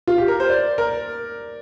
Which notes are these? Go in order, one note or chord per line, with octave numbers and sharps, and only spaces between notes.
F4
G4
A#4
C5
D5
A#4